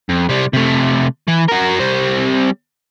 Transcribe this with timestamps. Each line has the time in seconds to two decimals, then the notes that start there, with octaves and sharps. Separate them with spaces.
0.09 F2
0.29 C3 G3
0.53 C3 A3
1.28 E3
1.49 F#4 A#4
1.79 G3 C4